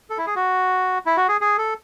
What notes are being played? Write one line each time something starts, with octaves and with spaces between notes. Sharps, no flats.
A4
E4
G#4
F#4
E4
F#4
G#4
G#4
A4